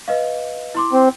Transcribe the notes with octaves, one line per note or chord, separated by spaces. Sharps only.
B4 D#5 F5
E4 C6 D6
C4